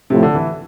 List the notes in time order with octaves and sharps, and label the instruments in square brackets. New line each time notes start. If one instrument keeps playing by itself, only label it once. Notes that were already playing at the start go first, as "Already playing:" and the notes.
[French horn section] A2 F3 A3 [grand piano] C3
[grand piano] D3
E3